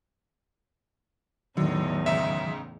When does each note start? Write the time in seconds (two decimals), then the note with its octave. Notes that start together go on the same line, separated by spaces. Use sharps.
1.57 E2 A2 D3 D#3 F#3 D#4
2.06 C#2 G#2 C#3 E5